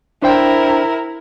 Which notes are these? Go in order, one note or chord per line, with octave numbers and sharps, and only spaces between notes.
D4 E4 A#4 C5 G5